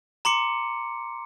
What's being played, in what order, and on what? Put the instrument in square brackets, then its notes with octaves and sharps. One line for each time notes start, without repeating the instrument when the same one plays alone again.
[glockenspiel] A#5 C6 D6 C#7